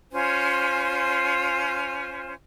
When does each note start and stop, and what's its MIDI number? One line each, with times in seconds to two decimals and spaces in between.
0.12 2.34 61
0.12 2.34 65
0.12 2.34 72
0.12 2.34 80